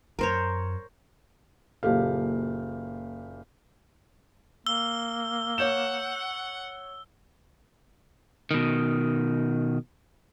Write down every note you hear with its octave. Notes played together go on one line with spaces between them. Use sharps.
F#2 A#4 C5 C#5
F#1 A#2 G4 A4 F5
A#3 E6 G7
C#5 F#5 G6 E7
B2 D#3